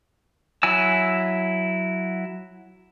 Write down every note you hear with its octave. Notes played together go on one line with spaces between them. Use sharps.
F#3 E4 G#5 E6